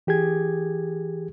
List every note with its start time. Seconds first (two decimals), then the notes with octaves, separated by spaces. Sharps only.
0.07 E3 G4 G#4 G#6